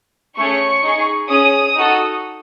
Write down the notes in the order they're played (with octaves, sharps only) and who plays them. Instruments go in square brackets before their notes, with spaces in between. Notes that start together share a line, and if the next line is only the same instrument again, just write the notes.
[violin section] A3 C#4 G#4 C#6
D#4 G#4
C#4 G#4 D#6
D#4 F#4 A4